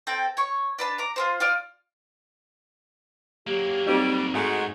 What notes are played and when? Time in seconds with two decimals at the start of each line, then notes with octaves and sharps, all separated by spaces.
0.07 C4 A4 G5
0.37 C#5 C#6
0.79 D4 B4 A5
0.98 A#5 D6
1.16 F4 G#4 C5
1.40 F4 D5 F6
3.47 F#3 A#3 G4
3.87 G3 C4 D#4 F#4
4.34 G#2 G#3 A3 F#4 A#5 D#6